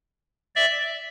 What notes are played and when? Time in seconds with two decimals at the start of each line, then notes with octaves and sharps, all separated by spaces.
0.55 D5 E5